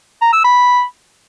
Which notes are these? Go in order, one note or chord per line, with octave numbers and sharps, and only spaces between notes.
A#5
E6
B5